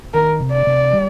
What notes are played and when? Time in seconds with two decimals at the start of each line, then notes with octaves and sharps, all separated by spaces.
0.14 D#3 A#4
0.40 C3
0.53 D5
0.67 C3
0.93 G3